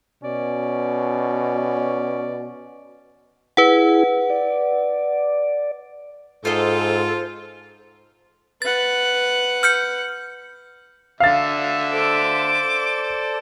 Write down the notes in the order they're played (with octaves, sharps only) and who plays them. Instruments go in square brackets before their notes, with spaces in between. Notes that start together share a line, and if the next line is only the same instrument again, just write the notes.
[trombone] B2 [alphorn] C#4 [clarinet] D5
[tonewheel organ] E4 G#4 [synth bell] B4 F#5
[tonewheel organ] D5
[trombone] G#2 [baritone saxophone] F4 [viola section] A4 [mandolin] C5 D#5
[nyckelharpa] B4 F#5 [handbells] A6
[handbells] F6 G6 C#7
[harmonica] D3 E5 [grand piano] F5 A6
[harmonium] A4 C5 D5 [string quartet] D6